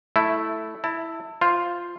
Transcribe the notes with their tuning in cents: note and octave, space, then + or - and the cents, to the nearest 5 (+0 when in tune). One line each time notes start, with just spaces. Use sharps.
A3 +0 E4 +0
E4 +0 A5 +30
F4 +0 C5 +0